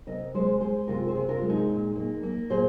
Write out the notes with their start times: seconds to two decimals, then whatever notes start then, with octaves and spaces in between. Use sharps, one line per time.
0.07 C3 A#4 D#5
0.34 G#3 G#4 C5
0.60 G#3 G#4 C5
0.88 C3 F4 A#4
1.08 G#4 C5
1.15 C3
1.29 F4 A#4
1.42 G#3
1.49 D#4 G#4
1.69 A#2
1.96 A#3
2.23 A#3
2.50 A#2 G#4 C5